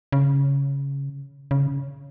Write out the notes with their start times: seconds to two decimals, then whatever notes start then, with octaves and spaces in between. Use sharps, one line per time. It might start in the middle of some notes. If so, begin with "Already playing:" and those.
0.12 C#3
1.51 C#3